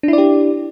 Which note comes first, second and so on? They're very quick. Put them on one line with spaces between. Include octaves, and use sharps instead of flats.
D4 E4 D5 G4